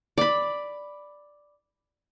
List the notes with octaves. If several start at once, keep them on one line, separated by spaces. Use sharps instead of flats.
D5 B5